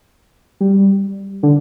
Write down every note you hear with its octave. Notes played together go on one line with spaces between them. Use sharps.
G3
D3